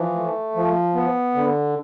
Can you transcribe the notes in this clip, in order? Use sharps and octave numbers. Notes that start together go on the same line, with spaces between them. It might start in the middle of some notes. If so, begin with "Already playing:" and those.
Already playing: E3 F3
A3
F3
B3
D3